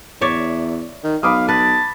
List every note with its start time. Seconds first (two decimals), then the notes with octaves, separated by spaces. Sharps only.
0.21 E2 C#5 D5 E5
1.04 D#3
1.23 B1 F5 B5 D6 D#6
1.49 B4 A5